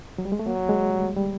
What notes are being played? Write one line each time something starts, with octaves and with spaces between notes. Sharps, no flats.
F#3
G3
G#3
A3
F#3 A#3
G#3
G3
G3